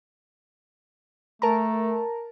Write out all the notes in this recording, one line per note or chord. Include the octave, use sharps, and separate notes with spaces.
A3 A#4 A5 A#5